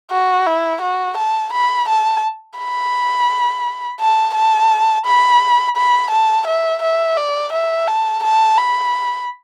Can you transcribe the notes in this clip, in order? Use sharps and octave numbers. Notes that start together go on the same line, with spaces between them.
F#4
E4
F#4
A5
B5
A5
B5
A5
A5
B5
B5
A5
E5
E5
D5
E5
A5
A5
B5